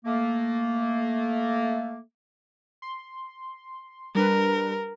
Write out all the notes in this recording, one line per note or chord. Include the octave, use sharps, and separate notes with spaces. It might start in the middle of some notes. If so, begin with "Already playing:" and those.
A3 A#3
C6
G3 D4 A#4 B4